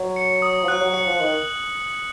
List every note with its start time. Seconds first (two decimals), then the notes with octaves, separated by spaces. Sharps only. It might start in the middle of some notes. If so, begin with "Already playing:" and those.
Already playing: F#3
0.16 C#7
0.42 D#6
0.64 F3
0.68 F#3 F#6
0.81 F#3
0.94 F#3 C#7
1.07 F3
1.20 D#3 F#7